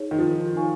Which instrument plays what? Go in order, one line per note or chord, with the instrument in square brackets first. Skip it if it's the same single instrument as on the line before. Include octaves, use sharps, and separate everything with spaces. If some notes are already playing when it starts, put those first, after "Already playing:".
Already playing: [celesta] D#4 G#4 C#5
[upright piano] D#3
F3
[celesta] D#4 A#4 F5 G#5 C#6